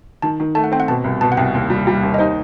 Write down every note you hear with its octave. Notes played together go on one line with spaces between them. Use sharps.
D#3 A5
D#3
A3 A5
F#5
C4 G5
F#5
B2 A5
C2
B2 A5
F#5
C2 G5
D#2
G3
G3
D#2
D#5
D#4 C5